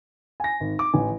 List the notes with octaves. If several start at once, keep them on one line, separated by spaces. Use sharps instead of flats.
G#5 A#6
G#1
D6
A1 G#5